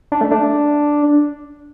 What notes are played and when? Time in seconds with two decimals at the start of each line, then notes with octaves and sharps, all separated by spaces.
0.12 D4
0.21 A3
0.31 D4